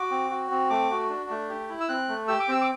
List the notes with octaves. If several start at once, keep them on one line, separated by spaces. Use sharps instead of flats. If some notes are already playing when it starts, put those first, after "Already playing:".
Already playing: F#4 D6
C4
F#4
C4
A3 D6
F#4
D4
A3
G4
E4
E6
C4 F#6
A3
G4 E6
D6
C4 E6
D6